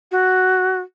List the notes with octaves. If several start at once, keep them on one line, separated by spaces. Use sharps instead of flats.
F#4